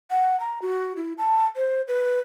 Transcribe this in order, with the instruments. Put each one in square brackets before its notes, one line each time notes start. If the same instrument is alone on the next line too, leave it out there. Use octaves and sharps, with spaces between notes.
[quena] F#5
A#5
F#4
E4
A5
C5
B4